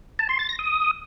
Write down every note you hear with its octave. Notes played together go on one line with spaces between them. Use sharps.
A5
C6
A6
A#6
D#6